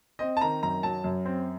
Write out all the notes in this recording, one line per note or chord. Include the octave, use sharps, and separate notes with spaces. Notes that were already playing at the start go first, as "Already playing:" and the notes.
C4 D#5
A5
D#3 A#5
F#2 A#5
F#3 A5
F#2
C4